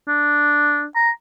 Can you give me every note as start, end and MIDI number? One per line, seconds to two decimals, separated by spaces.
0.08 0.85 62
0.96 1.11 82